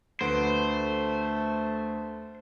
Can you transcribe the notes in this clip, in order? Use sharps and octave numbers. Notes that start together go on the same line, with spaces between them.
D2 A3 B4 C5 D7